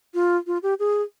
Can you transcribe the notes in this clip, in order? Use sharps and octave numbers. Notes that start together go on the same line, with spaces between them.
F4
F4
G4
G#4